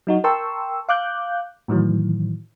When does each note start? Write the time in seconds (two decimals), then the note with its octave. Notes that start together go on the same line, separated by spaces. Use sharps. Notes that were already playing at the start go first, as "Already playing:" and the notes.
0.07 F#3 D#4 F#4
0.24 A#4 G5 A5 C6 C#6 E6
0.89 F5 D6 F#6 G6
1.68 A2 D#3 E3 F#3